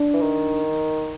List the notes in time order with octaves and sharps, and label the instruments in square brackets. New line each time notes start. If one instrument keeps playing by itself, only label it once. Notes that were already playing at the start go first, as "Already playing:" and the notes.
Already playing: [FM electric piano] D4
[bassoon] E3
D#3